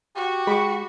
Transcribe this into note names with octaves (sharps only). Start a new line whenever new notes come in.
F#4 G4
G#3 B5 C#6 D6